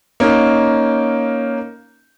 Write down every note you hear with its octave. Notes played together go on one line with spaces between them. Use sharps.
A#3 C#4 D#4